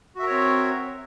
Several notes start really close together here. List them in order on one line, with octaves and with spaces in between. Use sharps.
F#4 E5 A#4 C#5 C4